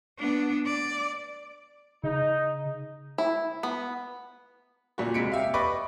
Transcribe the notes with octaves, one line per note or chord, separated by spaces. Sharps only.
B3 D4
D5
C#3 D#4
E4
B3
A#2 G3 F#4
C3 G#3 B6 C#7 D7
G4 E5 F5
B4 D5 D#5 B5 C#6 D6